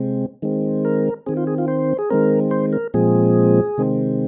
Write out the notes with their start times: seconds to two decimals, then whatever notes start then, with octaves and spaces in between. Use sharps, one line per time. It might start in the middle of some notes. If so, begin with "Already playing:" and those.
Already playing: C3 G#3 C4
0.42 D#3 G#3 C4
0.85 A#4
1.26 D#3 C4 G#4
1.37 F4
1.47 G#4
1.58 F4
1.68 C5
1.98 G#4
2.10 D#3 G#3 C4 A#4
2.51 C5
2.73 A#4
2.94 A#2 F3 G#3 C4 G#4
3.78 C3 D#3 G#3 C4